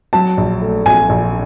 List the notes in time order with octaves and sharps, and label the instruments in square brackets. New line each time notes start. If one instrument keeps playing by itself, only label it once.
[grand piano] F#3 [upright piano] A5
[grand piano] A#1
A3
[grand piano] A#1 [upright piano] G#5
[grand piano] A#1